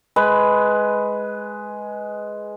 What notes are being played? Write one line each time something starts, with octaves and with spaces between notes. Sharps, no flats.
G#3 B4